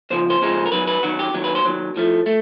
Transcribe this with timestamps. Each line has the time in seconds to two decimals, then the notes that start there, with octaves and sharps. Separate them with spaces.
0.10 D#2 C#3 F3 C5
0.30 C5
0.41 D#2 C#3 F3 G#3
0.66 A#4
0.72 F#2 D#3 F#3 B4
0.87 B4
1.03 F#2 D#3 F#3 F#4
1.19 G4
1.34 D#2 D#3 F#3
1.44 B4
1.55 C5
1.65 D#2 D#3 F#3
1.96 A2 F3 A3
2.26 A3